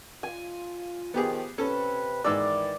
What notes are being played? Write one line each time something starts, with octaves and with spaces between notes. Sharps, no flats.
F4 G#5
D#3 F3 B3 G4 G#4
C3 C#4 A4 B4
G#2 D#3 E3 D5 D6 E6